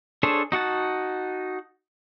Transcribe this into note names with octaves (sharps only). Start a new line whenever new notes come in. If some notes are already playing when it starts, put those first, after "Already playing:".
D4 G#4 A4 C5 C#5
D#4 F#4 F#5 A5